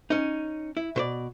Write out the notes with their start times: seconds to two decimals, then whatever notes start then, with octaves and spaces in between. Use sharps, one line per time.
0.10 C#4 D#4
0.77 E4
0.96 B2 C5 D5